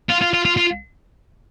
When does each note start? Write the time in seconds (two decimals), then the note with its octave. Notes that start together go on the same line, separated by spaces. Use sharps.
0.09 F4
0.21 F4
0.33 F4
0.45 F4
0.57 F4